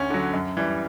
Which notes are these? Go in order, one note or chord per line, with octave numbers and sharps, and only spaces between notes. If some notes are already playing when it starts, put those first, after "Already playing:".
Already playing: D2 C#4
D3 F#3
F#2
E3 G3